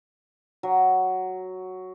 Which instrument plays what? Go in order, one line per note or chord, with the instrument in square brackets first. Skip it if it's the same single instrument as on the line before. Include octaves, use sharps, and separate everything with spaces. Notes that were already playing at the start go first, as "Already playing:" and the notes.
[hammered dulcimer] F#3